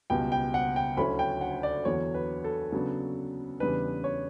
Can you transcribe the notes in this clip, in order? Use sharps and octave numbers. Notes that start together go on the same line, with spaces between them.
C#2 B2 G3 B3 G5
G5
F#5
G5
D2 D3 F#3 C#4 E4 B5
G5
F#5
D5
E2 D3 F#3 C#5
B4
A4
C#3 F#3 B3 D4
E2 C#3 G3 D4 B4
C#5